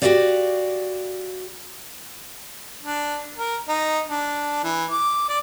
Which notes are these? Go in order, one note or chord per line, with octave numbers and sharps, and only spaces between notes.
F#4 G4 A4 C5 D5 F5
D4
A#4
D#4
D4
E3
D6
D5